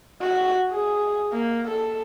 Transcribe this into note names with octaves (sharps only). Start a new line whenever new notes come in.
F#4
G#4
A#3
A4